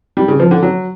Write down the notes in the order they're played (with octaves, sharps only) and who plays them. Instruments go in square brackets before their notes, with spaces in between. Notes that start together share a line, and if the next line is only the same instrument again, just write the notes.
[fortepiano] G3
C#3
F3
D3
F#3